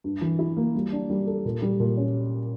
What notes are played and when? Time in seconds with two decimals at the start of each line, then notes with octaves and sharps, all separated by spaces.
0.04 G2
0.21 E3
0.39 E4
0.57 A#3
0.75 G3
0.92 D4
1.10 G3
1.27 A4
1.45 A#2
1.62 G3
1.80 A#2
1.97 C#4